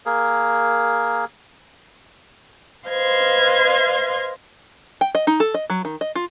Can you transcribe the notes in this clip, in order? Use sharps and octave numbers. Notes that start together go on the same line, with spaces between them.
A#3 G#4 A#4
B4 C5 D#5 F5 C6 G#6
G5
D#5
D#4
A4
D#5
F#3
D#3
D#5
F4